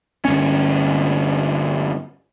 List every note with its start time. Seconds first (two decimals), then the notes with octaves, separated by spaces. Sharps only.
0.25 G1 C#4